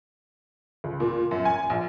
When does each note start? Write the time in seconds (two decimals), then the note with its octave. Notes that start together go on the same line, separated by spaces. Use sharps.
0.84 C#2
1.00 A#2
1.31 F#2
1.45 G#5
1.70 A#1